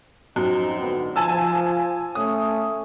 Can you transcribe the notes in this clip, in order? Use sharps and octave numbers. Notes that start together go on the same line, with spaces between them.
F#2 F3 C4 D#4
G#2 D3 B3
F3 G#5 A5 E6
A3 C#4 D#6